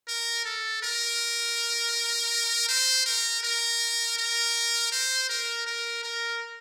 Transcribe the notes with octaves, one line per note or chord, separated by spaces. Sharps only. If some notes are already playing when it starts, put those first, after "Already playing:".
A#4
A4
A#4
C5
A#4
A#4
A#4
C5
A#4
A#4
A#4